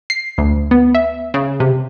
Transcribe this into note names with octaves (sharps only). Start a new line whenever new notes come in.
C7
D2
B3
E5
C#3
C3